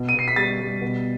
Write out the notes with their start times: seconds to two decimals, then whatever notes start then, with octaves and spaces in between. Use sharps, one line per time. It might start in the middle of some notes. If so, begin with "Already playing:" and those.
Already playing: B2
0.09 D#7
0.14 B2 C7
0.28 B6
0.36 G3 A6
0.60 G3
0.81 B2